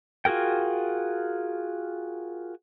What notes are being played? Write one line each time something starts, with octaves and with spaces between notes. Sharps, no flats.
F4 F#4 G#4 A#4 G5